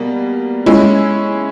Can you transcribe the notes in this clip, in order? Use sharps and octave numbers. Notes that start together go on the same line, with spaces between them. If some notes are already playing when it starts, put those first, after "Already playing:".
Already playing: B2 G3 A#3
G#3 C#4 E4